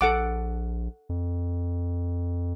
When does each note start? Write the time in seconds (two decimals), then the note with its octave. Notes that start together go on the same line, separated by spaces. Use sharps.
0.01 A#1 A4 F#5 D6
1.09 F2